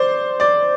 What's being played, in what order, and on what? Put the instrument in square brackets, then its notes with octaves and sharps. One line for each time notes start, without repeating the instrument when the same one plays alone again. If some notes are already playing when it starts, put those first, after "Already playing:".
Already playing: [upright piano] C5 D5
D5